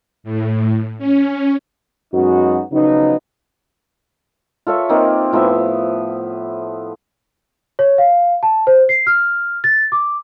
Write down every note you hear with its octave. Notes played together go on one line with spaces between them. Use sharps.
A2
C#4
F#2 G#3 B3 D#4 F#4
C#3 F3 F#3 B3 D#4
F4 A4 C#5 E5
A#3 C4 D#4
A2 F3 B3 E5
C#5
F5
A5
C5
C7
F6
A6
D6